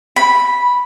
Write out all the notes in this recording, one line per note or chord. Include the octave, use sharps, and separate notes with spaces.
B5